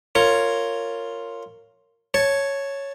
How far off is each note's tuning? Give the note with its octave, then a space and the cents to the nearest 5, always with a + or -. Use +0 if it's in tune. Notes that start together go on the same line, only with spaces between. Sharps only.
F4 +0 A#4 -20 C#5 +0
C#5 +0 A5 +0